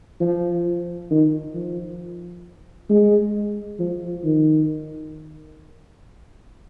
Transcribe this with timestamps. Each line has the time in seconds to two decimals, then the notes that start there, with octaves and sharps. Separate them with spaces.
0.20 F3
1.11 D#3
1.55 F3
2.90 G#3
3.79 F3
4.24 D#3